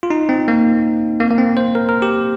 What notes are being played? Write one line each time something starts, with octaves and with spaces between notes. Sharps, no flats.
F4
D#4
C4
A#3
A#3
A#3
C4
C5
A#4
A#4
G4